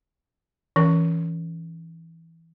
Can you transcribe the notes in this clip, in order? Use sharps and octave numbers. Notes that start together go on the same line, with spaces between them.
E3 C#4 A#4